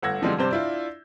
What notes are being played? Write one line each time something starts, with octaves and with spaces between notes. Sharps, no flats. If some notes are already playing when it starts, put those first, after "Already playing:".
G1 A3 F#5 E6 G#6 A#6
D3 E3 F3 G3 G#3 C4
G2 C3 C4 C5 D5 G6
D4 E4 F4